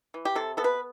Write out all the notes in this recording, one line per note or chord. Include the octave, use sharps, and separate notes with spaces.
E3
G4
C3 A4
B3 A4
B4